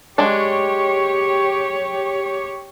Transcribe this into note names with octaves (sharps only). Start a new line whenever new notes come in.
G#3 D4 G4 C#5